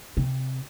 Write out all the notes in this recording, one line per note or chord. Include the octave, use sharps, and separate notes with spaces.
C3